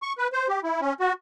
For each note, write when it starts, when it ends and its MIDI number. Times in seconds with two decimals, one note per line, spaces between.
0.02 0.13 85
0.18 0.28 71
0.33 0.48 72
0.48 0.60 67
0.63 0.81 64
0.81 0.93 61
1.00 1.13 66